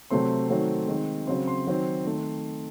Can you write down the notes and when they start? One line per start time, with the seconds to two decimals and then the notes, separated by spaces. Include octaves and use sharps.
0.11 C3 F#3 A3 C4 C6
0.49 D#3 F#3 A3 C4
0.88 D#3 G#3 C4
1.27 C#3 F#3 C4 C6
1.47 C6
1.67 D#3 F#3 C4
2.05 D#3 A3 C4